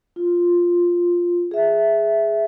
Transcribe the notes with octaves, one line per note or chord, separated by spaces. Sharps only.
F4
G#4 E5